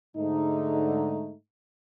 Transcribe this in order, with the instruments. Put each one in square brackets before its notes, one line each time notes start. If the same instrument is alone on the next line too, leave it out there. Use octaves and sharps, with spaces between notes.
[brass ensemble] G#2 D3 A3 D#4